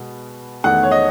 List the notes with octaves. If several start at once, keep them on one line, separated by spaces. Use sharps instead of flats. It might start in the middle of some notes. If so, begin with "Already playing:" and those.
Already playing: B2 G#3 B3
E2 D#3 A3 F#5
C#5
D#5